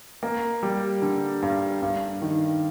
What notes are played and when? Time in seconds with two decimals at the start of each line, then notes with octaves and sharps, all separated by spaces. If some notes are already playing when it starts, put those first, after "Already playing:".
0.23 A#3
0.63 G3
1.02 D3
1.42 G2
1.82 G2
2.22 D#3